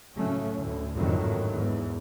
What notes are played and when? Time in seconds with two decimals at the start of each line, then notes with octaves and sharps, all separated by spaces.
0.16 A2 C#3 F#3 A3 C#4
0.57 D2 A2
0.95 G#1 F2 A2 D3 D#3 F#3
1.52 E2 G#2